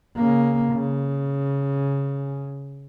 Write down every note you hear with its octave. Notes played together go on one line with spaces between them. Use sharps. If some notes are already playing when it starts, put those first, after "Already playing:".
C#3 A#3
C#3